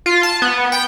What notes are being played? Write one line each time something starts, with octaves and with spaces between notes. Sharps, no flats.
F4
A5
B3
G5